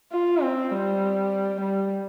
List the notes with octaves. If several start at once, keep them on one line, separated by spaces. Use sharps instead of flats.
F4
C4
G3
G3